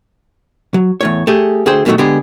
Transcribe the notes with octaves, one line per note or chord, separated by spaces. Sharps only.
F#3
E2 A2 C#5
A3 G4 G#4
D2 D3 G#4 C5 G5
G2 B2 D#3 F3 F#3 A3
D3 G#3 B3 G4 G#4